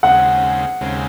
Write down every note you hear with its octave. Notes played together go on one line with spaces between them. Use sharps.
D#2 C#3 G#3 C4 F#5
D#2 C#3 G#3 C4